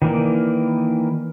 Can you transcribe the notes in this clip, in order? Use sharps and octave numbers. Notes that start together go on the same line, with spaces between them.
D#3 E3 A#3 D5